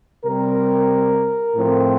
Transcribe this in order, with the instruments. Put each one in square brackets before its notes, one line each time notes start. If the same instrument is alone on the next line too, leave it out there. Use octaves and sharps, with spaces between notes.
[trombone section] C3 G3 C4 A#4
A2 F3 C4